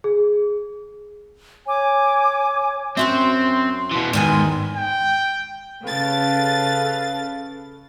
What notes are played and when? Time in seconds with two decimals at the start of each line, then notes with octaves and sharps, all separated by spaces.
0.04 G#4
1.67 C#5 G#5 D6
2.97 F#2 C4 F#4 E5 C6
3.91 B2 E3
4.13 E2 G#2 D#3 G#5
4.76 G5
5.84 C#3 A4 B4 F5 A6